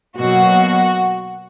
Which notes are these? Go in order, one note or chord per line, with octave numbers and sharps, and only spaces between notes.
B2 F#3 A#3 F#4